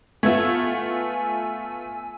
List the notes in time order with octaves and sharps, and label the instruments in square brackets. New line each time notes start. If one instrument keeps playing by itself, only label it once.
[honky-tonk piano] A3 B3 F4 [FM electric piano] G#5 E6